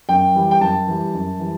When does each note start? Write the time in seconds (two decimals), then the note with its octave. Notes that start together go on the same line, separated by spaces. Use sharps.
0.09 F#2 G5
0.35 E3 G3
0.51 G5
0.60 F#2 A5
0.87 E3 G3
1.14 F#2
1.39 E3 G3